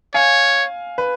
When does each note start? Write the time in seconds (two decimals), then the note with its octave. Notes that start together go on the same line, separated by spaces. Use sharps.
0.14 C#5 F5 G#5
0.98 B4